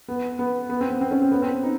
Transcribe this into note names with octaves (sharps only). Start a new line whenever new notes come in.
B3
B3
B3
C4
B3
C4
C#4
C4
B3
C4
D#4